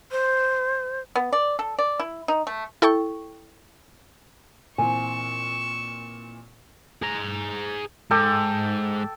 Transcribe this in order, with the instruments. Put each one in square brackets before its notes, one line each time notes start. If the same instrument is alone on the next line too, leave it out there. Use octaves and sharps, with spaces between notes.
[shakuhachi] C5
[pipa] B3
D5
A4
D5
E4
D#4
A3
[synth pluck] E4 A4 G5 C#6
[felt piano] A#2 E3 C4 [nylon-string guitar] G#5 [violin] C#6 E6
[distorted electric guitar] G#4 A#5
[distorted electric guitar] G#2 [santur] A4 G5 D6